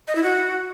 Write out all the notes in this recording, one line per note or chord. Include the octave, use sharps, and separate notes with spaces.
D#5
E4
F#4